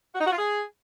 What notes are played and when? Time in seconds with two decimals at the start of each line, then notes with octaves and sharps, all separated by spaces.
0.15 F#4
0.21 D#4
0.27 F#4
0.32 F4
0.38 G#4